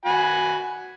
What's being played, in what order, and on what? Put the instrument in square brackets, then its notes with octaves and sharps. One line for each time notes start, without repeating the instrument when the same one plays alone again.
[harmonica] F#4 G#5 B5